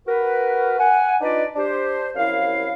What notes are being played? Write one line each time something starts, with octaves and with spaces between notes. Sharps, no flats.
F#4 A#4 B4
F#5 G#5
D4 D#4 F4 B4 D5 D#5
D4 G4 C5
C2 F#2 E4 F5